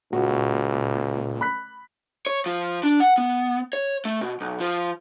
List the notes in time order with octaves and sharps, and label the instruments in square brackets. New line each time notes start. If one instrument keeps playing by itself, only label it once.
[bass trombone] C#2 [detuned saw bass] A#2 [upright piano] F#4
[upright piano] B5 F#6 B6
[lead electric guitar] C#5
F3
D4
F#5
B3
C#5
A3
B2
B1
F3